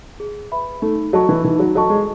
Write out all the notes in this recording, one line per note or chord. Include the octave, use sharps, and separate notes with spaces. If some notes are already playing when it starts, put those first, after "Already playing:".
G#4
B4 E5 B5
A3 D#4
F#3 A4 D#5 A5 C#6
E3
E3 D#4
F#3
F#3 A4 D#5 A5 C#6
G#3